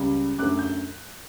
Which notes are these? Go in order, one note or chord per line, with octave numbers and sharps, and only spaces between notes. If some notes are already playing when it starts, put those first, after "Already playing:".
Already playing: C#2 C#3 G3
F#2 D3 A3 D6 F#6
G6